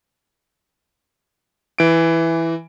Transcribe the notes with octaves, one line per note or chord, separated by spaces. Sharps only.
E3 D7